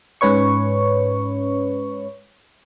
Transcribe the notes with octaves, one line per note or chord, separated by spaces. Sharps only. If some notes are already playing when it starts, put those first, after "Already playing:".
G#2 C#4 B4 C#5 C#6